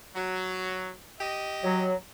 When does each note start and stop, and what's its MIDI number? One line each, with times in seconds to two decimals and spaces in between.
0.16 0.90 54
1.20 1.86 67
1.20 1.86 75
1.64 1.94 54